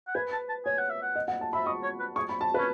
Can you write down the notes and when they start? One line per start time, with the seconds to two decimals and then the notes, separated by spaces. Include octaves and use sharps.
0.07 F#5
0.15 B4 G#5
0.32 A5
0.49 A5
0.65 C#5 G#5
0.78 F#5
0.90 E5
1.02 F#5
1.15 D#5
1.28 F#5
1.41 A5
1.53 E5 B5
1.66 D#5 C#6
1.83 C#5
2.00 B4
2.16 G#4 C#6
2.29 B5
2.41 A5
2.54 B4
2.58 C#4